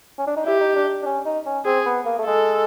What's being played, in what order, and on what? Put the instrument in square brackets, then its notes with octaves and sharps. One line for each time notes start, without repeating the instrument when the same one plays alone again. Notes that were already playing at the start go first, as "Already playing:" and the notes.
[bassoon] C#4
D4
D#4
[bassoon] E4 [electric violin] G4
[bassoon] D#4
D4
D4
C#4
D#4
C#4
[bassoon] C4 [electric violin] G#4
[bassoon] B3
A#3
A3
[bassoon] G#3 [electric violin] A4